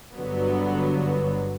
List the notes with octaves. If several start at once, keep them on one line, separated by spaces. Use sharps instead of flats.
G1 G2 D3 F#3 B3